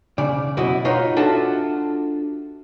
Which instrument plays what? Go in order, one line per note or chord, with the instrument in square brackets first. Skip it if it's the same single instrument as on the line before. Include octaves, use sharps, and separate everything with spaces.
[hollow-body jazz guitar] C#3 D5
F#2 B2 E4 F#4 D#5
D#4 F4 B4 C#5 D#5 F5
D4 F4 F#4 A4 E5